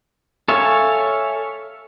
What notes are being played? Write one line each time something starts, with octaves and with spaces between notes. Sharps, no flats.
A4 C#5 E5 F5 G#5